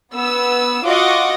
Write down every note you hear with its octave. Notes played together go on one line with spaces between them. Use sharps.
B3 E6
F4 F#4 D#5 F#5 C#6 D6